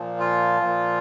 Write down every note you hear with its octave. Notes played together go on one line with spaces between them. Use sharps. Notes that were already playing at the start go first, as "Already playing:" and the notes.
Already playing: A#2 F3
F4
A#2 F3